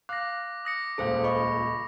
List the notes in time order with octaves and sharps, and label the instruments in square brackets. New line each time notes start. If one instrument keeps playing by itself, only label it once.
[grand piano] F5 [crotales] D6 A#6 [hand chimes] F#6
[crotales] D#6 A#6 C#7
[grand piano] D#1 C#2 A#2 [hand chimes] A4 C5 F5
[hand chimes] D#5 B5 C#6